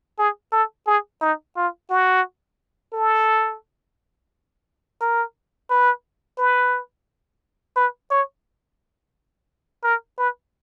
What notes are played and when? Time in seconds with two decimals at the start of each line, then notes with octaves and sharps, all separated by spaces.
0.19 G#4
0.52 A4
0.87 G#4
1.21 D#4
1.57 F4
1.90 F#4
2.94 A4
5.02 A#4
5.70 B4
6.38 B4
7.76 B4
8.11 C#5
9.84 A#4
10.18 B4